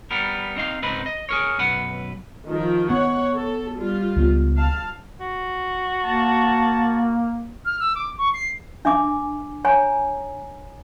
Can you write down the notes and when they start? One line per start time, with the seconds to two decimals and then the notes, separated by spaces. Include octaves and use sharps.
0.11 G3 B3 A#4
0.56 C4 D#4 F5
0.82 C#2 G#2 C4 D#4 B4 B5
1.06 D#5
1.29 G#4 A#4 C#5
1.58 B1 F#2 B4 F#5
2.48 D#3 F3 A#4
2.90 B3 C#5 F#5
3.35 A4
3.76 G3 F4
4.16 C#2 B3
4.57 F5 A5
5.20 F#4
6.04 A#3 A5
7.65 F6
7.80 E6
7.95 D6
8.18 C#6
8.34 C7
8.85 D4 E5 G#5 D6
9.65 C#5 G#5 A#5